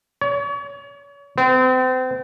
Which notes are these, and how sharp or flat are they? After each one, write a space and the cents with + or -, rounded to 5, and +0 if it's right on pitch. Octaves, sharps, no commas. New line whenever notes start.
C#5 +35
C4 -35